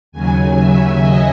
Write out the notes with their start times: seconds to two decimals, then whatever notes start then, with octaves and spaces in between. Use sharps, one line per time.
0.12 D#2 C#3 F#3 G#5
0.56 E5
1.00 D#5